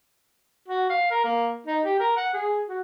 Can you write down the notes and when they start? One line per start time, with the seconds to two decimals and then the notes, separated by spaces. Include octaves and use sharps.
0.68 F#4
0.90 F5
1.11 A#4
1.24 A#3
1.67 D#4
1.85 G4
2.00 A#4
2.17 F#5
2.34 G#4
2.69 F#4